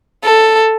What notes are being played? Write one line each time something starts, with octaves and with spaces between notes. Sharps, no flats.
A4